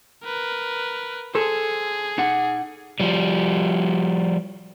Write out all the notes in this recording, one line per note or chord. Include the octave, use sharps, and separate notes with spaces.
A#4 B4
G#4 A4 C5
D#4 F#5
F3 G3